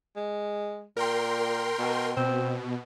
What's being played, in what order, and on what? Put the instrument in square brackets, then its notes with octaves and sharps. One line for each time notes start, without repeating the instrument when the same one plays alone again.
[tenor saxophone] G#3
[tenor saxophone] A#2 [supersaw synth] A#4 G5 C6
[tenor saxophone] B2
[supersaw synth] B2 [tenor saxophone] C4